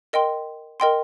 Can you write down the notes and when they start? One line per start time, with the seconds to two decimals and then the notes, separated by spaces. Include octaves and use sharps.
0.13 A#4 D#5 G5 C6
0.80 A#4 D#5 G5 C6